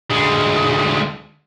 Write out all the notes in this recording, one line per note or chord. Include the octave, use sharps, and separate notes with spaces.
D2 G#3